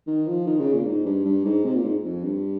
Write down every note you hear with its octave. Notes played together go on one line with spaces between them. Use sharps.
D#3
F3
D#3
C#3
A#2
G#2
G2
G2
G#2
C3
A#2
G#2
F2
G2